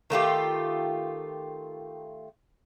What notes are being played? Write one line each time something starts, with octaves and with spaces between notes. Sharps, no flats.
D#3 A3 F4 G4